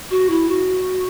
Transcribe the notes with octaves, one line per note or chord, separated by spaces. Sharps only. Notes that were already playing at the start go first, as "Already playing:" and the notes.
F#4
E4
F#4